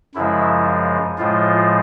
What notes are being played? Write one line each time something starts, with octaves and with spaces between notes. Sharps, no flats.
F#2 C#3 F3 G#3 E4
A2 F3 G#3 F4